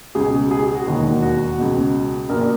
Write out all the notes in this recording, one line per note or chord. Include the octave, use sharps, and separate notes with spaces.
C#2 B2 G#4
G#4
G#4
F#4
E1 D#2 D#3 F#4
F#4
C#2 B2
A#1 A#2 A#4